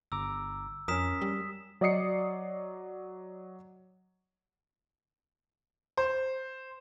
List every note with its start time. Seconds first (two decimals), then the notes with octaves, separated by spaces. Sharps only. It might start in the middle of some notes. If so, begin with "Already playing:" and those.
0.12 G1 A#5 D6 E6
0.88 F2 C#4 A#4 D#6 B6 E7
1.21 G3
1.81 F#3 D5 D#5 D#6 C7 C#7
5.97 C5